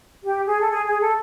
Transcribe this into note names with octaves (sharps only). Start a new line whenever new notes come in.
G4
G#4
A4
G#4
G#4
A4